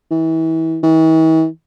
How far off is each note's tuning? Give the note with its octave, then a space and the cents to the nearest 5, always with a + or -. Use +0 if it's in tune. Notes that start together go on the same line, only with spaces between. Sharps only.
E3 -30
E3 -45